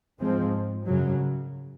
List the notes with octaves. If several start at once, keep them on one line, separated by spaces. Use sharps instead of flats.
G#2 F3 G#3 C4
F#2 C#3 F#3